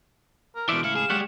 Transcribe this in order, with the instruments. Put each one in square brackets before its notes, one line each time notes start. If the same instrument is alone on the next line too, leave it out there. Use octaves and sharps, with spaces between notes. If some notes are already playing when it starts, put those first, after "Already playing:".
[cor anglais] A#4
[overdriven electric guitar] B2 E3 [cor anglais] F3 [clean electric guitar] D5 E5 [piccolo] D7
[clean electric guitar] C#2 A2 [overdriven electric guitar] E4 [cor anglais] F5 [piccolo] C#7
[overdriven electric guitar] G#4 [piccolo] E7
[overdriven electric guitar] G3 G#3 [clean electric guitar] G4 C#5 F#5